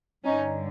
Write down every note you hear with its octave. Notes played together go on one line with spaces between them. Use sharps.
G2 D3 C#4 D#4